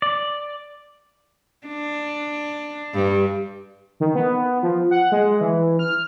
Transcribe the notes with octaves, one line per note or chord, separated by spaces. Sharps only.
D5
D4
G2
D#3
B3
F3
F#5
G#3
E3
F6